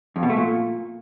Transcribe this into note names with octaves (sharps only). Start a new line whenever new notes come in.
F2
B2
A3
A#2